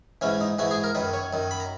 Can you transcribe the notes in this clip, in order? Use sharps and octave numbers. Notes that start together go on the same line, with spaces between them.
G#2 E3 C#4
D#4
G#2 E3 F#4
G#4
A#4
F#2 D#3 B4
C#5
F#2 D#3
B5
A#5